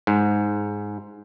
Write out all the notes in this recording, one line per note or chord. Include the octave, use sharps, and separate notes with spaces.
G#2